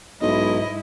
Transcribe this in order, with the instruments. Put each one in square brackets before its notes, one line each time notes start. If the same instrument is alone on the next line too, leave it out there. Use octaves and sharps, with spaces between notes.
[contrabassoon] B1 [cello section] G#2 E4 [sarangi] D#5